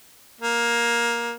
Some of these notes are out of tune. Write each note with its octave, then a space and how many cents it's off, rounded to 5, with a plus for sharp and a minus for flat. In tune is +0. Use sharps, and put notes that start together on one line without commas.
A#3 +15